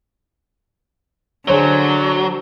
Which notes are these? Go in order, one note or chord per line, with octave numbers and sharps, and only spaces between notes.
D3 F#3 G#4 C5 C#5